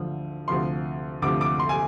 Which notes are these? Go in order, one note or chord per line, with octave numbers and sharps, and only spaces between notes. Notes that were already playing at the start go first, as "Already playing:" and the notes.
Already playing: D2 D3 F3
D2 C3 F3 C6
D2 C3 F3 D6
D6
C6
G#5